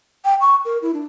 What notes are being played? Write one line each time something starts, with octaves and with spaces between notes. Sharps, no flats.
G5
C#6
A#4
E4
D4